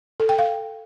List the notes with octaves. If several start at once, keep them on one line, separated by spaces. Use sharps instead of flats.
A4
G5
F5